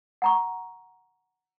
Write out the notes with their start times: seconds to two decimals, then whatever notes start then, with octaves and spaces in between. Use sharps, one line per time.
0.22 F#5 A#5 C#6